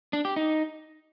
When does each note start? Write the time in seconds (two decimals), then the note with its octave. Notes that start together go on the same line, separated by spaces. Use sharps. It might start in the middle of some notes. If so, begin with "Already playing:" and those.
0.13 D4
0.25 G4
0.36 D#4